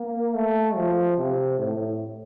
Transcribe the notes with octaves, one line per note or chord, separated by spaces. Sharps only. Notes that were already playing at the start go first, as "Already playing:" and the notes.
Already playing: A#3
A3
F3
C3
A2